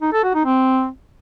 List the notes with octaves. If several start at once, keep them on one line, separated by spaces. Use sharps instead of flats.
D#4
A4
F#4
D#4
C4